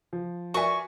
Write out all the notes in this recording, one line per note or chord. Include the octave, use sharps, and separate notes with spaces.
F3
F#4 A#4 B4 D5 E5 G#5 C#6